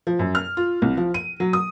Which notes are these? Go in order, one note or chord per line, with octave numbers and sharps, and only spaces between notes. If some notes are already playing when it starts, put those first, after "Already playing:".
F3
F#2
F6
F4
C2
F3
D#7
F#3
D#6